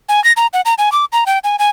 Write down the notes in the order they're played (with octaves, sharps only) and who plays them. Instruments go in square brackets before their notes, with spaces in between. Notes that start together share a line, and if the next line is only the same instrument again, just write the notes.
[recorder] G#5
A#6
A#5
F#5
A#5
G#5
D6
A#5
G5
G#5
G#5